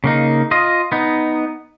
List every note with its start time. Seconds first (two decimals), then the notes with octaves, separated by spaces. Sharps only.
0.04 C#3 A#3 D#4
0.51 F4 D#5
0.92 B3 D#4